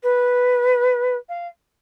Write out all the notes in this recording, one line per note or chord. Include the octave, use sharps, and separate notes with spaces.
B4
F5